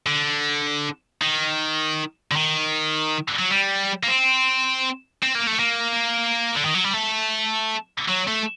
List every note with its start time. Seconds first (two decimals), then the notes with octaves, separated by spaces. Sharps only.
0.06 D3
1.22 D#3
2.31 D3
2.36 D#3
3.39 F#3
3.51 G3
4.03 A#3
4.08 C4
5.23 C4
5.35 A#3
5.47 A3
5.59 A#3
6.55 D3
6.65 D#3
6.74 F#3
6.84 G3
6.94 A3
8.09 F#3
8.28 A3